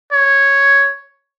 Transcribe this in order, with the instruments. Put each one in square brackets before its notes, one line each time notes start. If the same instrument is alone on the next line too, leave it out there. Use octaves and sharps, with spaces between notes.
[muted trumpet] C#5